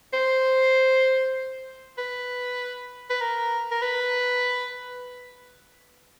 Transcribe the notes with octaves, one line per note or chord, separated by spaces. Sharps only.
C5
B4
B4
A#4
A#4
B4